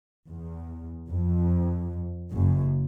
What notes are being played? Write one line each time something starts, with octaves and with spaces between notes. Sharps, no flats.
E2
F2
F#1 F#2